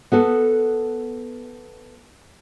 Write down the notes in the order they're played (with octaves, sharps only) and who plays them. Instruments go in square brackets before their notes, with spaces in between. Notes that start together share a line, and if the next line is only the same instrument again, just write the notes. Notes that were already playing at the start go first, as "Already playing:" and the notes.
[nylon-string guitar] B3 F#4 A4